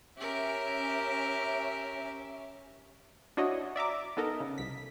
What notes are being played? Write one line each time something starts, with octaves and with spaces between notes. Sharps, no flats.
C#4 G4 A#4 E5
D4 E4 F#4 C#5 D#5
D5 E5 A#5 D6
B3 D#4 A4 A#4 D#5
C#3
C2 B6